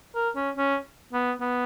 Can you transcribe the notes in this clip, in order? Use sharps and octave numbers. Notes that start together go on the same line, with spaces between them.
A#4
C#4
C#4
B3
B3